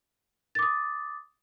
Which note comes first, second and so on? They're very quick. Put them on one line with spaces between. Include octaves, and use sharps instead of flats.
A6 D6 D#6